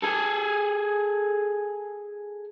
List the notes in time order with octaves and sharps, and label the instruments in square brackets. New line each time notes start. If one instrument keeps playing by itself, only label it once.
[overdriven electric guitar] G#4 A4